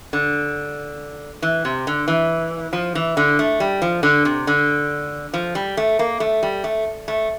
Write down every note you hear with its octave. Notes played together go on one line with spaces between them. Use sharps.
D3
E3
C3
D3
E3
F3
E3
D3
A3
G3
F3
D3
C3
D3
F3
G3
A3
A#3
A3
G3
A3
A3